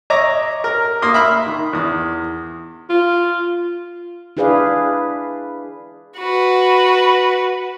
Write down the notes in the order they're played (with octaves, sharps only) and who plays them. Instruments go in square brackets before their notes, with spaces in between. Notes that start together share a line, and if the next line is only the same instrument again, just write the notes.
[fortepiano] C#5 D#5 E5 A#5 D6
A#4
A#3 C6 D#6
E5 B5 F6
D#3
E2 D#6
[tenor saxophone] F4
[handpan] D4 E4 G#4 B4 D5 F5
[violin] F#4 B4